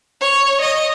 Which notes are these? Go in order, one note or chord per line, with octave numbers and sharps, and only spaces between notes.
C#5
D#5